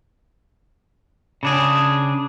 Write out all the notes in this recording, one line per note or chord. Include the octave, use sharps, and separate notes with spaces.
C#3 D4 G#4